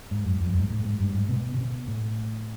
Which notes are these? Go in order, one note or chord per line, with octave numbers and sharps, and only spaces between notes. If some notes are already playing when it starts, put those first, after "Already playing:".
G#2
F#2
F2
F#2
G#2
A2
G#2
G2
G#2
B2
C3
B2
A2